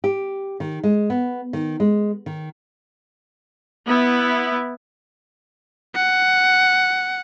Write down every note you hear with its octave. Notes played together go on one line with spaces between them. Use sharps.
G4
D#3
G#3
B3
D#3
G#3
D#3
B3 E4
F#5